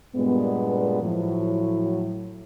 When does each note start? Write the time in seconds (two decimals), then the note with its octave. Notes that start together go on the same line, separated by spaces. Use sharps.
0.16 G2 A#2 G#3 B3
1.02 A2 F3 F#3